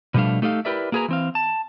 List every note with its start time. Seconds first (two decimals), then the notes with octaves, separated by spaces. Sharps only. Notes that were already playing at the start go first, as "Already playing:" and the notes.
0.14 B2 F3 G3 A3 D4 F5
0.42 A3 D#4 G4 A4 C#5 F5
0.65 E4 G4 A#4 B4 D5 E5
0.92 A#3 F#4 G#4 B4 G#5 A#5
1.08 E3 C4 F5
1.35 A5